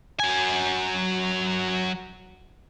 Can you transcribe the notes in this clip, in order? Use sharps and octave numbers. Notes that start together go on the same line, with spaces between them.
F#3 G#5